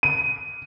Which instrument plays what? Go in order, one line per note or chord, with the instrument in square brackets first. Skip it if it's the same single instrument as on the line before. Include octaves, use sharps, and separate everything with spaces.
[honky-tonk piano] D#7